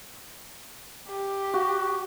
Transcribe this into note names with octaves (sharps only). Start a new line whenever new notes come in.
G4
F#4